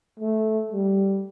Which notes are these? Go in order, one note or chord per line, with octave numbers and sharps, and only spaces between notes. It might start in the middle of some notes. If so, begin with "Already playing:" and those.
A3
G3